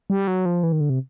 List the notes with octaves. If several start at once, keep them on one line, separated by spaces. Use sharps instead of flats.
G3
F#3
F3
E3
D#3
D3
C3